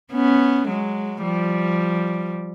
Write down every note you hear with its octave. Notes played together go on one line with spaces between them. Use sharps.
B3 C#4
F#3 G#3
F3 G3